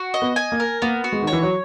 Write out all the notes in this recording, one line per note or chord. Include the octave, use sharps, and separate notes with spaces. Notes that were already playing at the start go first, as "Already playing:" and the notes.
Already playing: F#4
D#5
B3
G#5
A#3
A#4
A#3 B3
F#4
G#3
D#3 C#5
E3
F#3